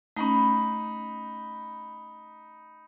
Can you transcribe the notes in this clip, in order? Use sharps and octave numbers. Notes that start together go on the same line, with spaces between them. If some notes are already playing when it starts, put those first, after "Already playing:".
A3 C#4 D#4 B5